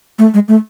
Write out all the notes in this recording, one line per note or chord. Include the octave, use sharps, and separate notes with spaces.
A3
G#3
A3